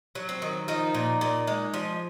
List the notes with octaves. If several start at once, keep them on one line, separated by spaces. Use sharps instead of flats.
F#3
C4
D#3
F3 D#4
A#2
A#2
G#3
F3